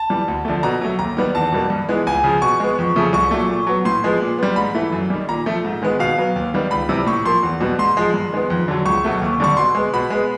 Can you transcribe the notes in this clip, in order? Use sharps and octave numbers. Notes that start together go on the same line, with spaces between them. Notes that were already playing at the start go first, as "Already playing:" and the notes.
Already playing: A5
E3 G3
D2
D3 F3 A3
B2 A#5
F#3 A3
D#2 A#5
D#3 G3 B3
E2 A5
B2 G3 A#3
G2
E3 G#3 B3
C#2 G#5
C#3 F3
B2 C#6
G#3 B3
F2
C#3 F3 A3
C2 C#6
A#2 F#3 A3
A#2
F#3 B3
A2 C6
F3 G#3 B3
A#2
G3 B3
G#2 B5
E3 A3
F#2
D#3 G3
A#2 A#5
F3 A3
G#2
D#3 G#3 B3
B2 F5
F#3 B3
D#2
D#3 G3 B3
C#2 B5
C3 E3 G3
A2 C#6
F3 A#3 C6
E2
B2 G3 B3
G#2 C6
F3 G#3
G2
D#3 G#3 B3
F2
D3 F#3
C#2 C#6
B2 F#3 A3
D#2
D3 G3 C#6
B2 C6
G#3 B3
B2 B5
G#3 B3